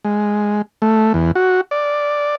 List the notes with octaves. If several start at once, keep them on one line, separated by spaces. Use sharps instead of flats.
G#3
A3
E2
F#4
D5